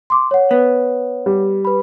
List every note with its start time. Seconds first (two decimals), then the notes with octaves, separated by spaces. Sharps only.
0.10 C6 D6
0.31 C#5 F#5
0.51 B3
1.26 G3
1.65 B4 B5